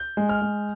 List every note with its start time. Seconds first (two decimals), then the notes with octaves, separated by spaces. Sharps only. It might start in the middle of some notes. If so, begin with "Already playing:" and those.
Already playing: G6
0.17 G#3
0.29 F6
0.42 G#3